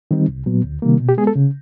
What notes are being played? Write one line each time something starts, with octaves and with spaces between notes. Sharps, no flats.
D#3 G3 C4 D#4
C2
A#2 F#3 B3
D2
C3 D#3 G3 A#3
B2
G4
G#3 B3 G#4
A4
C#3